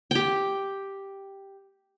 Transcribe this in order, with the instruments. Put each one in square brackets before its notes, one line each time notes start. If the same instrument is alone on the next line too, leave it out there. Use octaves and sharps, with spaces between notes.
[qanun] G4 G5